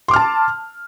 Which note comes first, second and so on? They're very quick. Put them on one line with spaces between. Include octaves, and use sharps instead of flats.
C6 D6 F6 A5